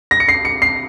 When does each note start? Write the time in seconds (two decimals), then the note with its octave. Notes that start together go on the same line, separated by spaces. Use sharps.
0.11 A#6
0.20 C#7
0.29 C7
0.45 C#7
0.62 C7